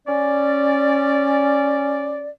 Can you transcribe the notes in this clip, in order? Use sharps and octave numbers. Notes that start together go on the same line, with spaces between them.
C#4 D5